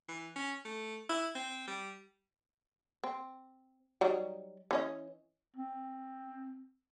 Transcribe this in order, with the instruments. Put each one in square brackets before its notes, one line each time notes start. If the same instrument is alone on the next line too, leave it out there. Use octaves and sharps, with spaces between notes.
[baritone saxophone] E3
C#4
A3
E4
C4
G3
[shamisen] C4
F#3 G3 D#4
E3 C#4 D#5
[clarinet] C4